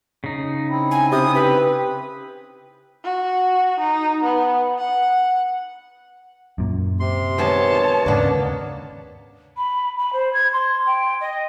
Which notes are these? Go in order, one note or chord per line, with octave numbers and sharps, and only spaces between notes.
C#3 D#4
C4 E4
G#5
C3 D#6
G4 B4
F#4
D#4
B3
F#5
F#2 A#2
C3 C6
D#3 G#3 B3 C#5 A5
D#2 G#2 C#3 A#3 B3 D4 A#4
B5
B5
C5
G#6
C6
G5
D#5